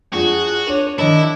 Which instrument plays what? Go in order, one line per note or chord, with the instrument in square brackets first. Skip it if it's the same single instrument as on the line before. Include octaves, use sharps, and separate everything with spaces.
[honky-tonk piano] F2 F3 D4 [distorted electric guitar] F#4 [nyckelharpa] G#4
[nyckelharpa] D4 C#5 [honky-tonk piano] D#7 F7
[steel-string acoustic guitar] D#3 D#5 A5 [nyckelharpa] D4 [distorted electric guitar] E4